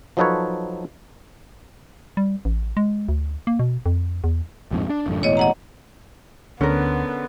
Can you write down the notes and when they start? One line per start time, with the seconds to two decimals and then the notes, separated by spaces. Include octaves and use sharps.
0.17 F3 F#3 D#4 A4 B4 C#5
2.17 G3
2.45 A1
2.77 G#3
3.09 D2
3.47 A#3
3.59 B2
3.86 F2
4.24 E2
4.71 A#1 F2 G#2
4.90 D4
5.06 A1 F#2 D3
5.23 E1 E2 A2 C#5 D#5
5.37 D#5 F#5 A#5
6.61 D2 D3 B3 C#4 A#4